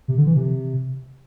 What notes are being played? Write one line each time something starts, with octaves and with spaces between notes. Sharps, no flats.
C3
D3
E3
C3